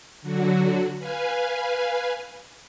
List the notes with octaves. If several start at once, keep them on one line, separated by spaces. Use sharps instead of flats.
D3 F#3 F#4
B4 F5 G#5